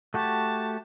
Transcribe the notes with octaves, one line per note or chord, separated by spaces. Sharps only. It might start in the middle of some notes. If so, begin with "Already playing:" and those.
A3 F#4 G4 A5